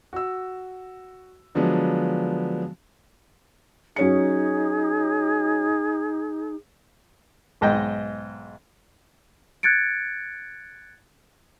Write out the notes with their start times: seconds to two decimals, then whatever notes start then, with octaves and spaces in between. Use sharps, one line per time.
0.13 F#4 E6
1.55 D3 F3 F#3 G#3 B3 D4
3.96 F#3 C#4 D#4 G#4 C#7
7.61 B1 G#2 D#5 G5
9.63 F#6 G#6 A6 C#7 D7